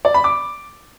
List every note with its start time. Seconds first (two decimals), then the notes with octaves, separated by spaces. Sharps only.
0.05 D5
0.14 B5
0.24 D6